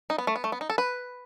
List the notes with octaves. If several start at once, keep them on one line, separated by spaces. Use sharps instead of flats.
D#4
B3
A3
B3
A3
B3
D#4
A4
B4